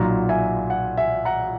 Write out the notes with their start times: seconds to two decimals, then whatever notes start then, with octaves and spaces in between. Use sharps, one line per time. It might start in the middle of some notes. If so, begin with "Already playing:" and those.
Already playing: B1 A#2 F#3 F#5 A#5
0.29 E5 G#5
0.70 F#5
0.97 E5 G#5
1.25 F#5 A#5